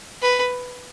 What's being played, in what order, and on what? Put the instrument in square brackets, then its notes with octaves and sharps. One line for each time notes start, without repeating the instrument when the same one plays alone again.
[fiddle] B4